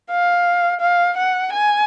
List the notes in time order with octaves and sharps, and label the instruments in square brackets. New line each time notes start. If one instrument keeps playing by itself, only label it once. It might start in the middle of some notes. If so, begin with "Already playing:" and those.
[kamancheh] F5
F5
F#5
G#5